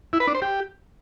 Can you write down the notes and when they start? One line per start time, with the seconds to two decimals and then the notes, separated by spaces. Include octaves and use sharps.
0.13 E4
0.20 B4
0.27 D4
0.35 C5
0.42 G4